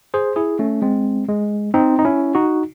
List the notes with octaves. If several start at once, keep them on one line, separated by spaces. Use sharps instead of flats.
G#4 C5
E4 G#4
A3 C#4
G#3 C4
G#3
C4 D#4
D#4
C#4 E4
D#4 F#4